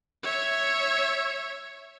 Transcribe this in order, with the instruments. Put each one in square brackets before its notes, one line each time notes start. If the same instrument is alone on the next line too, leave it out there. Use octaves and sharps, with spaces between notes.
[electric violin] C#5 E5